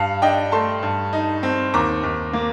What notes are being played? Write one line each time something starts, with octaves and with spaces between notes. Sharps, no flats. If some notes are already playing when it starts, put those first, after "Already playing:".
Already playing: G2 F5 A5
D4 D#5 G5
A3 A5 C6
G2
D#4
C4
D#2 A#5 D6
D#2
A#3